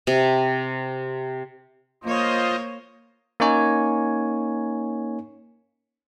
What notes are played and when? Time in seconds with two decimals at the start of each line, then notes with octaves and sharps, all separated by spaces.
0.07 C3
2.04 A#3 F4 C5 C#5 D#5
3.40 A#3 C#4 D#4 C#5 G#5